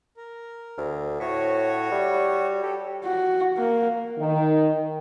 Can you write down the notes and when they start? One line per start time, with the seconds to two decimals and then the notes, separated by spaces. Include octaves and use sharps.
0.17 A#4
0.78 D2
1.20 A2 F#4 C#5
1.91 G3
2.63 G4 A4
3.04 F#4
3.57 A#3
4.19 D#3